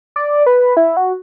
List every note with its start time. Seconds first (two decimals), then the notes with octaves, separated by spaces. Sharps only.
0.16 D5
0.46 B4
0.77 E4
0.97 F#4